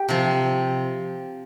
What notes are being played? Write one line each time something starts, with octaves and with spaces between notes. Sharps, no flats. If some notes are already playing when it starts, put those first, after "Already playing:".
Already playing: G4
C3 F3